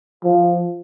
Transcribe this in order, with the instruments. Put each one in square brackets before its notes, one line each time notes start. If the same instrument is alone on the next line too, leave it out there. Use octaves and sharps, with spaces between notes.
[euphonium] F3